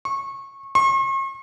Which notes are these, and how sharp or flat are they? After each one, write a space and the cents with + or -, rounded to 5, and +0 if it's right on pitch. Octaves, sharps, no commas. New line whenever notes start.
C#6 -25
C#6 -45